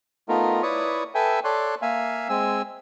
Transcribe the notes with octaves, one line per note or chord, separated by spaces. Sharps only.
A3 B3 D#4 F4 A#4
E4 B4 C#5 D5 C#6 D#6
A4 B4 E5 G5 G#5
A4 C#5 D5 C6 F#6
A#3 E5 F5 G#5
G#3 C4 G#5 E6